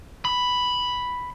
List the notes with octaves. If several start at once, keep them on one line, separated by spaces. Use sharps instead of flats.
B5